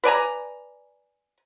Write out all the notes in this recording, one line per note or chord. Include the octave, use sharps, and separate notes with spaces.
B4 D5 G#5 A#5